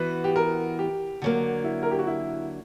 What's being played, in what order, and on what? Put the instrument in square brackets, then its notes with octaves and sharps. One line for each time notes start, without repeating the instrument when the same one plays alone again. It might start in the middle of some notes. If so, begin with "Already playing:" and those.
Already playing: [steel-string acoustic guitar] E3 B3 F#4 [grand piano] B4
[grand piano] G4
A#4
G4
[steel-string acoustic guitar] D3 F#3 A#3
[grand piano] E4
A#4
G4
F#4
E4